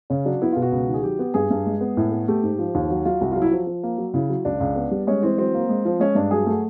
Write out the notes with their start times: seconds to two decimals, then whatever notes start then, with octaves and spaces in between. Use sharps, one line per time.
0.10 C#3 C#4
0.25 F#3 D4
0.42 B3 E4
0.52 B2 F4
0.62 F#4
0.72 C#2
0.89 D#3
0.94 G#4
1.03 F#3 G4
1.19 B3
1.34 G2 G#4
1.51 G2
1.66 G#3
1.81 B3
1.97 A2
2.12 B3
2.28 A3 G4
2.43 G#2
2.59 F3
2.75 D#2
2.90 F#3 F#4
3.05 F#3 F4
3.21 C2 F#4
3.32 F#3 F4
3.42 E4
3.51 F3
3.67 F3
3.83 A#3
3.98 F#3
4.14 C#3 E4
4.29 F#3
4.45 C#2 D4
4.60 C#2
4.76 B3
4.91 G3
5.07 G#3 C#4
5.23 E3 C4
5.38 F#3 C4
5.54 A#3
5.69 G#3
5.85 F3
6.00 G#3 C#4
6.15 G2 D4
6.31 F#3 G#4
6.46 A3 F#4